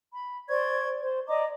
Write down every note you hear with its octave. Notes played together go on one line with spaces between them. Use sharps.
B5
C5 D5 C#6 G#6
C5
D5 D#5 A#5 D6